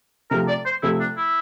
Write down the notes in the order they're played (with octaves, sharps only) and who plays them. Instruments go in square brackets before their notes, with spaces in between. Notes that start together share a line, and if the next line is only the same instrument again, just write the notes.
[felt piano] C3 F3 A3 [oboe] A#4
[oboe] D5
C5
[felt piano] C3 F3 A3 [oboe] E4
[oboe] D4
E4